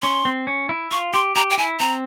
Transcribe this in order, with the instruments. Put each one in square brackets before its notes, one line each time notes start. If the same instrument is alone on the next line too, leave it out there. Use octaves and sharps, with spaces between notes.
[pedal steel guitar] C#4 [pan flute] C6
[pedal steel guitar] C4
C#4
E4
[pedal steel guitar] F4 [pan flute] C#6
[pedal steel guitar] G4 [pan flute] C6
[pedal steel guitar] G4 [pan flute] A#5
[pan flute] G5
[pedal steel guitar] E4 [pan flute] G#5
[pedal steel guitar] C4 [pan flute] A#5